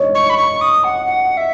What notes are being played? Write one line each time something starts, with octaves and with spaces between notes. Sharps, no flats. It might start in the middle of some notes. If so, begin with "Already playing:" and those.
Already playing: C#5 D#5
C#6
B5
C#6
D#6
F#5
F#5
E5